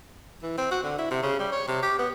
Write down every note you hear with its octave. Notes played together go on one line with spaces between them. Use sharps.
E3
C4
F#4
D3
E4
C3
C#3
G3
C#5
C3
G4
B3